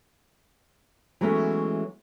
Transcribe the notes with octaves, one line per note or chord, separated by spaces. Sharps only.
E3 F#3 G#3 A3 B3 C#4